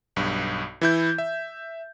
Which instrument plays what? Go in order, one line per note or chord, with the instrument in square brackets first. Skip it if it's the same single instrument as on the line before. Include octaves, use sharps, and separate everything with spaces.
[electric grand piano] B1 G2
E3 E4 G6
E5